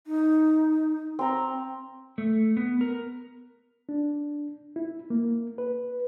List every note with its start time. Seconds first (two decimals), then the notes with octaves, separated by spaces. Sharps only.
0.06 D#4
1.19 C4 A#5
2.18 A3
2.57 B3
2.81 A#4
3.89 D4
4.76 E4
5.10 A#3
5.58 B4